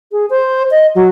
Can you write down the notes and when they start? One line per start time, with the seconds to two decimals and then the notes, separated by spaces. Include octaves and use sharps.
0.12 G#4
0.30 C5
0.71 D#5
0.95 F#3